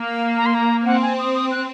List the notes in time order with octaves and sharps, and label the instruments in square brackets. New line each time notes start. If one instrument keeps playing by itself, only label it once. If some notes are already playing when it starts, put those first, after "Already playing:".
Already playing: [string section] A#3
[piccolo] A#5
C6
A#5
[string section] C4 [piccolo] F#5
[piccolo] G#5
D#6
D#6
F#6